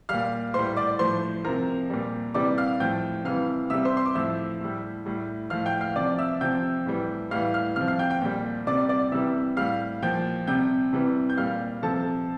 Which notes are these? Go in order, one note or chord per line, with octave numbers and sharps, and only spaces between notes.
A#2 G3 F5 F6
A2 G3 C5 C6
D5 D6
A2 F3 C5 C6
C3 F3 A#4 A#5
A#2 G3
C3 E3 G3 D5 D6
F5 F6
A2 F3 G5 G6
C3 E3 G3 F5 F6
C3 G3 E5 E6
C5 C6
C6
D6
A2 F3 E5 E6
A2 G3
A2 G3
A2 F3 F5 F6
G5 G6
F5 F6
C3 F3 D5 D6
E5 E6
C3 F3 G5 G6
A2 E3 G3
A2 E3 G3 F5 F6
F5 F6
C3 F3 F5 F6
F5 F6
G5 G6
G5 G6
A#2 G3
C3 G3 D5 D6
D5 D6
C3 E3 G3 E5 E6
A2 G3 F5 F6
A#2 F3 G5 G6
C3 G3 G5 G6
C3 E3 G3
G6
A#2 G3 F5 F6
C3 F3 A4 A5